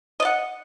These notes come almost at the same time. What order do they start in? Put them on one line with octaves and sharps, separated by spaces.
D#5 D5 F#5